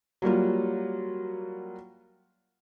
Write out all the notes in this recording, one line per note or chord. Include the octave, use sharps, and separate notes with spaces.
F#3 G3 A#3 F4